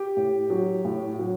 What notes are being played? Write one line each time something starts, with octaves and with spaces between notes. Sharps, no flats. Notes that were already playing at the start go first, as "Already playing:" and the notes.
Already playing: G4
A2
F#3
A2
F#3